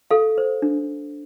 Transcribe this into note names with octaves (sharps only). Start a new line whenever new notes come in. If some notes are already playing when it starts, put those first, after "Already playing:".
A4 F5
C5
D4